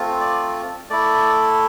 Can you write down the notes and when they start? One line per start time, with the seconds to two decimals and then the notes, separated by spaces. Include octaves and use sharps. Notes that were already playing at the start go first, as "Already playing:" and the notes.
Already playing: A3 C4 F4
0.20 D5
0.89 A3 E4 D5